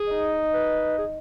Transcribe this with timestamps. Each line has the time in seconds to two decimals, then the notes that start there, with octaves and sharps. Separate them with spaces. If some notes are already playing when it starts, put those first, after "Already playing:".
Already playing: G#4
0.10 D#4
0.53 B4
0.98 G#4